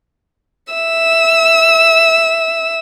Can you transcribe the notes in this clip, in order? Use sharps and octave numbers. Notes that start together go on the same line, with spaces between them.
E5 E6